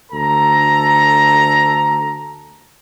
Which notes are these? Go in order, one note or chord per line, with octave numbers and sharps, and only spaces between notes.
D2 A4 A#5